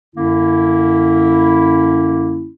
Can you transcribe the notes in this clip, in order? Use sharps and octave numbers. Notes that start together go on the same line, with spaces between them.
F#2 D3 A#3 C#4 E4